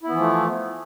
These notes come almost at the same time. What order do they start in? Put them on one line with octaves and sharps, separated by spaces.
E4 B3 E3 F3 A3